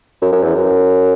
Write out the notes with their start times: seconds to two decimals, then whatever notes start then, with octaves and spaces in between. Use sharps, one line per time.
0.22 F#2
0.33 F#2
0.43 E2
0.55 F#2